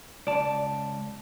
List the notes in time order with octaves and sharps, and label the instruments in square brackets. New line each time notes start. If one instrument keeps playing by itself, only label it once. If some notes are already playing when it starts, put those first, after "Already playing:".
[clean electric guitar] C#2 A5 [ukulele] D5